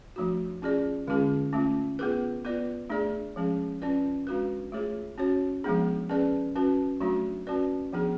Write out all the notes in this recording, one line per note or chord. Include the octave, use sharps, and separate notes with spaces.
F3 A3 D4 F#4
C#4 F4 G#4 D5
D3 G#3 C#4 F4 G#4
A3 C#4 F4
B3 F4 G#4 B4
B3 F4 B4 D5
A3 D4 G#4 D5
F3 G#3 C#4 G#4
C#4 F4 B4 D5
G#3 D4 F#4 B4
A3 F4 G#4 C#5
C#4 F#4 C#5
F3 G#3 B3 D4 G#4
C#4 G#4 B4 D5
C#4 F#4 B4
F#3 A3 D4 F#4
C#4 F#4 B4 D5
F3 B3 D4 G#4